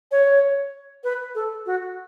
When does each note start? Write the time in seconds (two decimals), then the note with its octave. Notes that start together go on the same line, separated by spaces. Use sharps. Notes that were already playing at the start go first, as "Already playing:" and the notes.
0.11 C#5
1.04 B4
1.35 A4
1.66 F#4